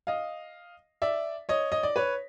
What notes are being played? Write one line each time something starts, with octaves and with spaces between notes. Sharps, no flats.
D#5 F5
D5 E5
C#5 D#5
D#5
D5
B4 C#5